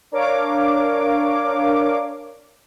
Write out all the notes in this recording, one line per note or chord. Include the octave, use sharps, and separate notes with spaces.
D4 A#4 C#5 F5 D6